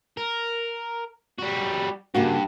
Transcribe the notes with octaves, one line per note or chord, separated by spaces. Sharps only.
A#4
G3 F#4
G2 C#3 A#3 F#4